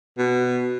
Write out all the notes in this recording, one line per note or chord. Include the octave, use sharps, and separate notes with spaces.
B2